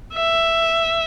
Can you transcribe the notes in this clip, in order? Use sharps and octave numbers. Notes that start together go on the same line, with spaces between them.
E5